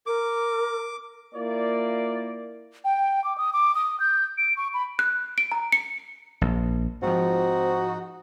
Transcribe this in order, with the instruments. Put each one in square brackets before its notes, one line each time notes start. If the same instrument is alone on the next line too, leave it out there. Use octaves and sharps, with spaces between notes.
[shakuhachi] A#4 [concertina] D6
[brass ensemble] A#3 E4 F4 D5
[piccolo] G5
D6
D#6
D6
D#6
G6
D7
C#6
B5
[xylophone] F#6
D7
A#5
C#7
[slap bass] A#1
[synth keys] G#2 F3 [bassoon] C4 [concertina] D#4 [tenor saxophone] F#4